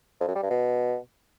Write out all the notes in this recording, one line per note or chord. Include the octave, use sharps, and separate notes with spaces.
F2
F#2
G3
G2
B2